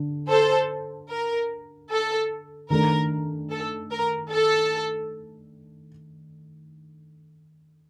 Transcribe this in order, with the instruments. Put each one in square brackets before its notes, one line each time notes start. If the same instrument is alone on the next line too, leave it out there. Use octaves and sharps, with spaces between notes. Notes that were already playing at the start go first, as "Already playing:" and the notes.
Already playing: [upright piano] D3 D4
[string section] A4 C5
A#4
A4
[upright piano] D#3 A3 D4 [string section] A#4
[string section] A4
A#4
A4